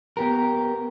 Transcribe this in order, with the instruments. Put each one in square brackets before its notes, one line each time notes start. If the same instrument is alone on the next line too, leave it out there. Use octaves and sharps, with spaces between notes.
[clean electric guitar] B3 G4 A#4